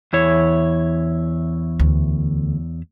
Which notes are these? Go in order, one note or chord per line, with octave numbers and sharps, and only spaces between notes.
E2 E4 C#5
D2